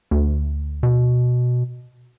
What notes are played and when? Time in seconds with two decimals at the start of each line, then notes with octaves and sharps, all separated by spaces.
0.11 D2
0.83 B2